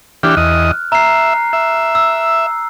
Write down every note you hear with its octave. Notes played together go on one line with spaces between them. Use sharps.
E3 D4 G4 F6 F#6
E2 D#5
E5 A#5 C7
E5
E6